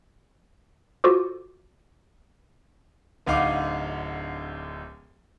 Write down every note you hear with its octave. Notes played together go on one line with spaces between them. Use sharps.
F4 F#4 A4 C5 D6
D1 D2 D#4 F5 F#5 D6